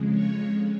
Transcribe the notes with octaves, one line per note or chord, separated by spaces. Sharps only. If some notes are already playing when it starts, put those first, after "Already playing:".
Already playing: F2 C#3 G#3
C#5